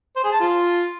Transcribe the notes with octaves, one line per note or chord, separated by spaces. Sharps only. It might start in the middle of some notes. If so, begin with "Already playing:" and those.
C5
G#4
A5
F4